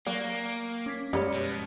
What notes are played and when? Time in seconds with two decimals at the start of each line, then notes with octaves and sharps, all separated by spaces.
0.07 F#3 A#3 D5 F5 G5
0.86 C#4 D6 G#6 B6
1.13 F#2 F3 G3 G#3 C#4 B4 C#5
1.34 B2